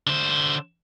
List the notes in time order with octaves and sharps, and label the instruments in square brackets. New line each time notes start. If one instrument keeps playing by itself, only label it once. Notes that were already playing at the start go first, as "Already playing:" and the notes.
[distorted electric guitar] D3 C5